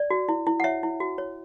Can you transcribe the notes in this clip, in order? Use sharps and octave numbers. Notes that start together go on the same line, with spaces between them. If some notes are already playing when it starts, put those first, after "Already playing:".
Already playing: D5
F#4
E4
E4
F#5
C#5 E5
E4
F#4
C#5